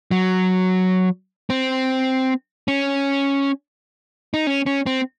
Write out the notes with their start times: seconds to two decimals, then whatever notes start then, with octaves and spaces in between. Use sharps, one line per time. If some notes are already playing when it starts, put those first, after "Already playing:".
0.11 F#3
1.50 C4
2.68 C#4
4.34 D#4
4.47 C#4
4.66 C#4
4.86 C4